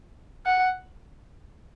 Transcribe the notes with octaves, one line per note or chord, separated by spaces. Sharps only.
F#5